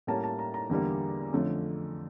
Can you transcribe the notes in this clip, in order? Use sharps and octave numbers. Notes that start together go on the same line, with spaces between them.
A2 G3 A#3 C#4 A5
A5
A#5
A#5
E2 D3 G3 A#3
F2 D3 F3 A3 C#4